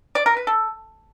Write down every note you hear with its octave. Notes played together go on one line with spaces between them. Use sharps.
D5
A#4
B4
A4